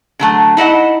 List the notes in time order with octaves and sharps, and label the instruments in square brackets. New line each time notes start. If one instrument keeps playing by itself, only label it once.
[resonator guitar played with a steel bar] D3 F#3 A3
D#4 E4 D#5 F#5